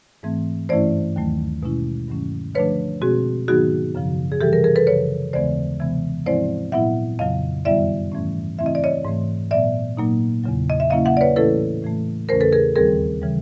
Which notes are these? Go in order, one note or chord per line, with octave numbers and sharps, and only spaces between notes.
G#2 E3 A3 C4
G2 E3 A3 C#4 E4 C5 D5
D#2 D#3 F#3 A3
B2 G#3 C#4 E4
G2 D#3 F#3 A3 C#4
D3 F3 A3 D4 B4 C#5
B2 G#3 C4 F#4 G#4
G#2 D#3 F#3 B3 D#4 F#4 G#4
F#2 C#3 F3
G#4
C3 E3 G3 G4 A4
G#4 A#4
G#4 A#4
A4 B4
F#2 C#3 F3 B4 C#5
D#2 C#3 E3 G#3 B3 C5 D5
C3 E3 G#3 B3
G#2 F3 G#3 C4 E4 C5 D5
A#2 F#3 B3 E4 E5 F#5
F2 C#3 F#3 D#5 F5
F#2 D#3 G3 B3 E4 D5 E5
G#2 E3 A3 C#4
C#3 E3 A3 C4 E4 E5
D#5
D5
C#5 D#5
G#2 E3 A3
A#2 F#3 B3 D5 E5
A#2 F#3 A#3 D#4
E2 C#3 F#3
D#5
E5
C#3 F#3 A#3 C#4 E4 D#5 F5
E5 F#5
D5
B4 C#5
A2 E3 A3 C#4 E4 A4 B4
A2 E3 A3
E2 C#3 E3 A3 C#4 A#4 C5
A4 B4
G#4 A#4
D#2 D#3 G3 C4 G#4 A#4
C#3 E3 G3